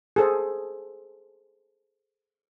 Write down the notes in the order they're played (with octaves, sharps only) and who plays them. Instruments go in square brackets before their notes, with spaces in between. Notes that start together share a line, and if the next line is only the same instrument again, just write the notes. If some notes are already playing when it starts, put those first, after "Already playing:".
[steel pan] G#4 A4 C5